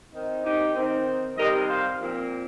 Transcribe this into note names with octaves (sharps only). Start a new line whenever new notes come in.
D#3 C4 D#4
D#4 G4
D#3 C4 D#4
C3 D#3 G3 A#4 D#5
C5 F5
A#2 F3 C4